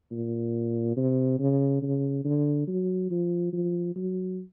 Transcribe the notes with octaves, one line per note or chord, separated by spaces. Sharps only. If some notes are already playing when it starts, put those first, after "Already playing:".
A#2
C3
C#3
C#3
D3
F#3
F3
F3
F#3